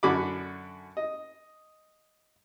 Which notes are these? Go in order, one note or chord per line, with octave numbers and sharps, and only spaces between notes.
F#2 D3 F#4 B5 D6
D#5